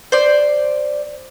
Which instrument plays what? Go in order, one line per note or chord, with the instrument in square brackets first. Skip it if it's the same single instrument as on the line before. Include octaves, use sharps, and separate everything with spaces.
[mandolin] C5 D5